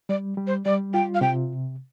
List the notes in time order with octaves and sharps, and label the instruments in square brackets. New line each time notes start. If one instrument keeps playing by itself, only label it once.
[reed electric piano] G3 [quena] D5
[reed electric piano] G3
[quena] C5
[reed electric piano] G3 [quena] D5
[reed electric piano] F4 [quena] G5
[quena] F5
[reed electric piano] C3 [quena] G5